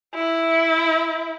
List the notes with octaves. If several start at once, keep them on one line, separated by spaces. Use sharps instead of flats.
E4